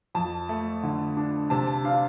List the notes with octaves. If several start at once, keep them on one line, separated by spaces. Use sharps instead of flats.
F2 A5
A3
D3
D4
C3 A5
A5
D4 F5